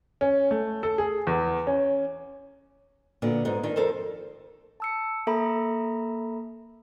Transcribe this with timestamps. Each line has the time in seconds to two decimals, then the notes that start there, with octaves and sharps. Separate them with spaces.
0.21 C#4
0.51 A3
0.83 A4
0.98 G#4
1.27 E2
1.67 C#4
3.22 A#2 D3 B3
3.45 G#2 B3 D#4
3.63 D#3 D4 D#4
3.76 F2 A4 A#4 C5
4.80 A5 E6 C#7
5.27 A#3 A4 E5 A#5 B5